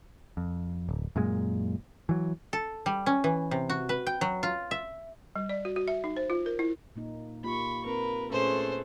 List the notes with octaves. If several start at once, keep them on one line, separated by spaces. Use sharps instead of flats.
F2
D1
F#2 A#2 G#3
E3 F#3
A4
G3
C#4
E3
C3
F#4
B4
G5
F#3
F4
E5
G3
D5
F#4
F#4
E5
D#4
C5
F4
A#4
E4
A#2 A#3 D#4
A#3 F4 G4 B5 C#6
C4 A#4 B4
A#2 A3 C#4 G#4 B4 C5 C6